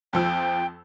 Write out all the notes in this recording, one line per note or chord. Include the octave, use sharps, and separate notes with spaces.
F2 F3 G5 E6